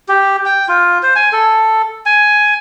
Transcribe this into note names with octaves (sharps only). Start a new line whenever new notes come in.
G4
G5
F4
C5
G#5
A4
G#5